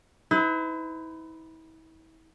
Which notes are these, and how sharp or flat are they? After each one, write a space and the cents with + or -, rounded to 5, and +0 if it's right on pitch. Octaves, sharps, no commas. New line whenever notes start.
E4 -40 B4 +40